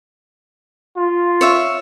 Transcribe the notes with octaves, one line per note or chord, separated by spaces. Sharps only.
F4
C#5 E5 F5